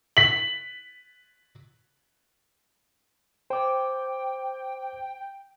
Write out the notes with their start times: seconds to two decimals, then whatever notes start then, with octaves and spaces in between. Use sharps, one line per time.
0.17 B6 F#7
3.50 C5 G5 D6